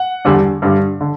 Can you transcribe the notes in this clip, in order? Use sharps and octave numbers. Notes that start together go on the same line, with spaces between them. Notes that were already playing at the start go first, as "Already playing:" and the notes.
Already playing: F#5
E2 D3 G3
G2 D3 G3
D3